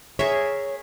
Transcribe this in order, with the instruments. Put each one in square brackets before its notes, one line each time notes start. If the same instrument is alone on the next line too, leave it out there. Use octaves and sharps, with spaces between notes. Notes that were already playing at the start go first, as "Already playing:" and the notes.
[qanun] G#4 A#4 E5 [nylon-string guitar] C#5